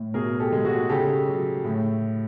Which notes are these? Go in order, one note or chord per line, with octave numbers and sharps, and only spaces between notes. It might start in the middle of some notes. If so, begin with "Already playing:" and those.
Already playing: A2
B2 G#4 A#4
G4 A4
G#3
F#4 G#4
C#3 G4 A4
F#3
A2